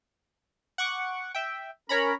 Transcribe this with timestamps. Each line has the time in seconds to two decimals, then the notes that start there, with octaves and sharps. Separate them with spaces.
0.78 F#5 C#6 D6
1.35 E5 G5
1.89 C#4 A#4 C#5 A#5 B5